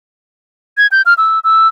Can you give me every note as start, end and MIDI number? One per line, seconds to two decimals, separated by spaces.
0.77 0.87 92
0.92 1.02 91
1.06 1.14 89
1.18 1.39 88
1.44 1.68 88